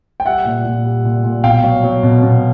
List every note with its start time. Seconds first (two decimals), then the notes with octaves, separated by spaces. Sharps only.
0.20 G5
0.25 G3 E5 F#5
0.45 A#2
0.65 A#2
0.85 G3
1.05 A#2
1.24 A#2
1.44 B2 F5 G5
1.64 F#3
1.84 F#3
2.03 B2
2.23 B2